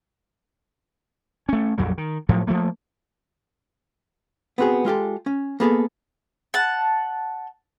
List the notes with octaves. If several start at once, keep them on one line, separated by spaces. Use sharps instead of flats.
A3 C#4
A#1 F2 F#3 G3
D#3
A2 F3 F#3 A3
F3 F#3 A3 A#3
B3 C4 F#4 G#4
G#3 F4 G4 A4
C#4
A#3 B3 G#4 A4
F#5 A5